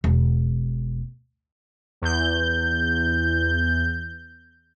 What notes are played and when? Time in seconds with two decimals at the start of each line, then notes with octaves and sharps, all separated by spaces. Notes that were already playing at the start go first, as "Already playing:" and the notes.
0.04 E1
2.02 E2 G6